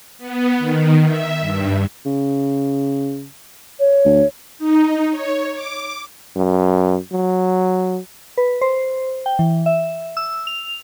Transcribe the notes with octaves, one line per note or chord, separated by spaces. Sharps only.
B3
D#3
E5
G2
C#3
C#5
D2
D#4
C#5
D6
F#2
F#3
B4
C5
G5
E3
E5
E6
F7